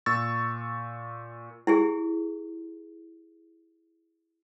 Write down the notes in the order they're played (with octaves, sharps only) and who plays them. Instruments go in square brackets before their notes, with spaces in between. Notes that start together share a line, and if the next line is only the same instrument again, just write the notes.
[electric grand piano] A#2 C#6 E6 A6
[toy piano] E4 G4 G#4